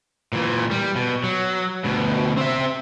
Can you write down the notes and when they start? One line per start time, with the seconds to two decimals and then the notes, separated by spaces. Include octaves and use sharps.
0.33 A#2 E3
0.71 G3
0.96 B2
1.24 F#3
1.84 D2 B2
2.37 C4 E5